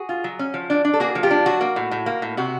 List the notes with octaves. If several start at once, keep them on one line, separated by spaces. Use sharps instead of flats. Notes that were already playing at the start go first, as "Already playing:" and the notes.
Already playing: F#4 G#4
F4
F#3
C#4
F3
D4
D4
A4
A#3 F#4 G#4
F3
F4 G4
D4
F#3 F#4
A#3
A2
A2
A#3
A2
C3 F#4